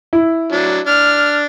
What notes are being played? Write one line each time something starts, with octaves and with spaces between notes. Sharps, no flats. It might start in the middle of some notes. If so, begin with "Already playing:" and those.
E4
F#3 D4
D4 F6